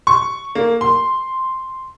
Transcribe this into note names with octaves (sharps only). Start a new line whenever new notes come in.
C#6
A#3
C6